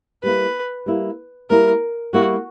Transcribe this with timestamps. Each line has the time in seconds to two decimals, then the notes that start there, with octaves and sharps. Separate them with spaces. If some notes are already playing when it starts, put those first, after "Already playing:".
0.23 G3 A#3 E4 B4
0.86 G3 A#3 E4
1.50 G3 A#3 E4 A#4
2.13 G3 A#3 E4 F#4